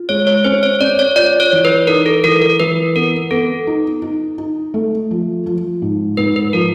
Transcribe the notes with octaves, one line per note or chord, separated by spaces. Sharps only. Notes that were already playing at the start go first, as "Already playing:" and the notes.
Already playing: F4
G#3 C#5
C#5
C#4 C5
C#5
C#4 D5
C#5
F4 D5
C#5
E3
B4
D#4 A#4
A4
E3 A#4
A#4
E3 B4
B3 A#4
B3 A4
D#4
D#4
D#4
A3
F3
F3
G#2
G#2 B4
B4
F3 A#4